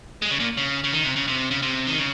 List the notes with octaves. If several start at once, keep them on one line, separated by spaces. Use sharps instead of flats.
G#3
C#3
A#2
C#3
C#3
D#3
C3
C#3
C3
C#3
C3
D#3
C#3